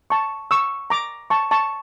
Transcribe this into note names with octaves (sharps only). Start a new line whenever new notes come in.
A5 C#6
C#6 E6
A#5 D6
A5 C#6
A5 C#6